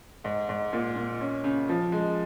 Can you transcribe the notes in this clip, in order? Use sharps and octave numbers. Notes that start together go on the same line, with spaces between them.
G#2
G#2
A#2
A#2
C#4
C#3
F3
G#3